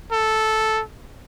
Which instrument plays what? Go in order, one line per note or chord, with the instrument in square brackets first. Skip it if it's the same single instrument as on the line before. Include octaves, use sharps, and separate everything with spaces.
[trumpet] A4